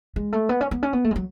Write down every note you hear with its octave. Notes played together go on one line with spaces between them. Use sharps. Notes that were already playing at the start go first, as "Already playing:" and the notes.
G#3
A3
B3
C#4
B3
C#4
B3
A3
G#3
F#3